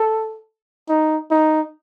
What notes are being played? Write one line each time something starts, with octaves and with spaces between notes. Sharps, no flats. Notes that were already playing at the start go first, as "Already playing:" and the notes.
Already playing: A4
D#4
D#4